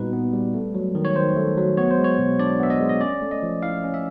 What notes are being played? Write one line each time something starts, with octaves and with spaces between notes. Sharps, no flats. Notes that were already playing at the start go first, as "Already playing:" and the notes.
Already playing: A#2 G3 B3 D#4 F#4 B4
B3
G3
A3
F#3
D#3
C#5
D#3 C5
A3
F#3
B3 C#5
C5
G#3
C#5
B2
D4 D5
B3 E5
D#5
G#3
D#5
C#4 D5
A3
D#5
F3
E4 F5
C#4
E5